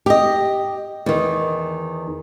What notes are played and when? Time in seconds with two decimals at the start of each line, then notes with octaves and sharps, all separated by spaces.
0.06 G4 D#5
1.06 E2 D#3